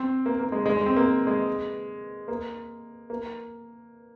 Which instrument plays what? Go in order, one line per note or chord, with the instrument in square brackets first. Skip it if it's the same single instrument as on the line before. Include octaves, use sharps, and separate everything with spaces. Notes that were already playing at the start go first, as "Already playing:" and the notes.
Already playing: [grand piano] C4
A#3
A#3
G#3
G#3
G#3
C4
A#3
G#3
A#3
A#3